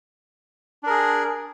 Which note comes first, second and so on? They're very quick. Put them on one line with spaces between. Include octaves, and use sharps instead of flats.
D4 A#4 G#4